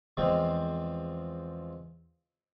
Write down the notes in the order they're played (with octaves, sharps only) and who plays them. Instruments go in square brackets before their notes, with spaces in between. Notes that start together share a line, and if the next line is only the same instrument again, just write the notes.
[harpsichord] E2 F3 G#3 C4